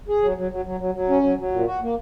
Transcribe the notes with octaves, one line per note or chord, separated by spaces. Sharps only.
G#4
F#3
F#3
F#3
F#3
F#3
F#3
C#4
F#3
F#3
A#2
F#4
A#3